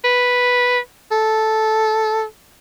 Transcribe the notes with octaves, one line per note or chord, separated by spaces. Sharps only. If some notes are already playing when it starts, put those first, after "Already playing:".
B4
A4